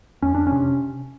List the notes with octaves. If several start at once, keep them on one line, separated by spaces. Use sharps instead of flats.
F2 C#4
D4
C3 C#4